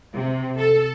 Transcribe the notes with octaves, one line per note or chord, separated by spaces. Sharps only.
C3
A4